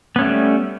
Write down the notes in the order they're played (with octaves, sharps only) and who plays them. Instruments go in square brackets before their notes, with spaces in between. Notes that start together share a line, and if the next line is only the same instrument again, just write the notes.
[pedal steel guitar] B3
C#4
A3
G3